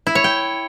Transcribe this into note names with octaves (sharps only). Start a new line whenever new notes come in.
E4
C#5
G5